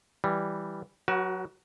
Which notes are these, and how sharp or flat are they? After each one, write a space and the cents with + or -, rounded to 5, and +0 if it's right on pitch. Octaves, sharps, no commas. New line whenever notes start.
E3 +0 G3 +0
F#3 -15 F#4 +20 B4 -45